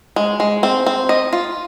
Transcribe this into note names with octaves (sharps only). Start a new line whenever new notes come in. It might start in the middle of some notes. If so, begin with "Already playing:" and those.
G#3
G#3
C4
C4
D#5
F4